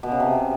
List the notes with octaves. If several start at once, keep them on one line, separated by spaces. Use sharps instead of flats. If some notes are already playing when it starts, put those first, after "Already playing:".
B2
C#3
C3